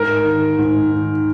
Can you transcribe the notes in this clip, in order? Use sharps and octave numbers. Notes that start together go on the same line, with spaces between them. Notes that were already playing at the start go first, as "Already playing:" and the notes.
Already playing: G#2 A#4
D#3
G#2
D#3